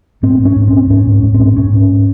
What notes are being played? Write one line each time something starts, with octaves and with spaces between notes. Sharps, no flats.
G#2 C4
G#2
C#4
G#2
G#2 C4
G#2 C#4
G#2
C#4
G#2
C4
G#2
G#2 C#4
G#2